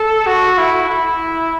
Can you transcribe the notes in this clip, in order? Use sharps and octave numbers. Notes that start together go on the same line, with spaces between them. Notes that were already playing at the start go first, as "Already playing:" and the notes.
Already playing: A4
F#4
E4
E4